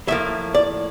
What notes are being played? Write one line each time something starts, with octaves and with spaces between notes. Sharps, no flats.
A2 F3 A#3 E5
D5